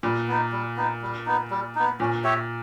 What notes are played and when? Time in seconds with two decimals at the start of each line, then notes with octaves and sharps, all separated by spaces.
0.03 A#2 G3
0.27 B3 D#4
0.52 G3
0.77 B3 D#4
1.02 G3
1.26 B3 D#4
1.51 G3
1.75 B3 D#4
2.00 A#2 C#4
2.24 G4 C#5 E5